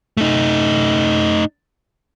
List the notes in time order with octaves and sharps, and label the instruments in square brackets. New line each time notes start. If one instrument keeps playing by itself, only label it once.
[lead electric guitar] A3 D#4